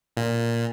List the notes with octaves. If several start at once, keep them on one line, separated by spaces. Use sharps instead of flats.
A#2